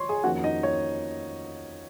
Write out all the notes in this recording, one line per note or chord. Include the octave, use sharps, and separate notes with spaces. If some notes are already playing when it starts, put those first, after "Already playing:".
Already playing: F3 C#5 C6 C#6
G#4 G#5
F2 D#3 A#3 C#4 F#4 F#5
D#4 D#5
C#5